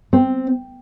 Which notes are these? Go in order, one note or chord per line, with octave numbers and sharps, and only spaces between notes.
C4